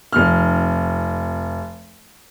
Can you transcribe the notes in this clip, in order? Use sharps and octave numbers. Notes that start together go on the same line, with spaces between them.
F1 F6